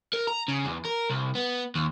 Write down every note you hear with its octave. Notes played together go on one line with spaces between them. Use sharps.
A#4
A#5
C#3
E2
A#4
C2
B3
D#2